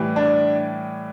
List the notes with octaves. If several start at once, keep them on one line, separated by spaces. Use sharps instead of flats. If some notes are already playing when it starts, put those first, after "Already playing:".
Already playing: A2 E3 G3
D4